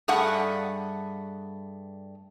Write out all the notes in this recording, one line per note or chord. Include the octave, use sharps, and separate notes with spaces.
G2 G3 A3 G#4 F#5